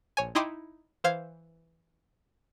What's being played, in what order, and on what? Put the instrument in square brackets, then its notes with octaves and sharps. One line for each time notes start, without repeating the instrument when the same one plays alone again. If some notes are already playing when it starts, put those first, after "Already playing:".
[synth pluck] A#1 C#5 G#5
D#4 E4 D#5 G5 C6 D6
E3 C5 F5 G#6